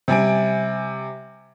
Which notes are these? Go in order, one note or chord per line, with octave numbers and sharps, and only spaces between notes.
C3 G3 G#5 D7